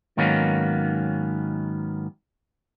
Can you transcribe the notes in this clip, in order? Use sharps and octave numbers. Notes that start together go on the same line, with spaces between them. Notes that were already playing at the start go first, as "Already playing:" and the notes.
G#2 D#3 F#3 A#3 B3 C#4